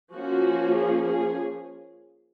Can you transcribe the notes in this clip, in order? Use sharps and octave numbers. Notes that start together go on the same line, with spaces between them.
F3 A#3 C#4 F#4
G#4
G#4